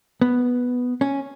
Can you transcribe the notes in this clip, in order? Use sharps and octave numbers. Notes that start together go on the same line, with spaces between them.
B3
C#4